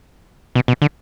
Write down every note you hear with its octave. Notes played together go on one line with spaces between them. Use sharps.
B2
B2
D3